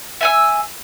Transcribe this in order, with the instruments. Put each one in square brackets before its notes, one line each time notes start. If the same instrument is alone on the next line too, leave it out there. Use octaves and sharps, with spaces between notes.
[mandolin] E5 G#5 E6